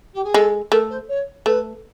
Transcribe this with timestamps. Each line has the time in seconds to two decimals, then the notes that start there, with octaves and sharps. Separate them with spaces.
0.14 G4
0.24 G#4
0.34 G#3 A4
0.71 A3 A#4
0.90 C5
1.08 C#5
1.46 A3 B4